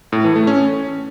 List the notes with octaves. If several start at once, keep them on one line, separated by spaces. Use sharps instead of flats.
A2
E3
A3
C#4